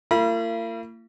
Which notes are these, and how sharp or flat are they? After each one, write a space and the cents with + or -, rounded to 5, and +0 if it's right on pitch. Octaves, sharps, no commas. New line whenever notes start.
A#3 -40 F4 -45 B5 -25